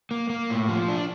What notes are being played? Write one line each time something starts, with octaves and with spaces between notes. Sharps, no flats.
A#3
A#3
A2
F3
D4